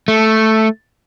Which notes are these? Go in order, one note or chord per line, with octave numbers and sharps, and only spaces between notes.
A3